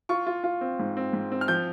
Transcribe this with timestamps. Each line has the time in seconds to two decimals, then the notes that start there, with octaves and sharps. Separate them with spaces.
0.09 F4 C#6
0.27 F4
0.44 F4
0.61 C4
0.79 G#2
0.97 C4
1.13 G#2
1.32 C4
1.41 F6
1.48 F3 G6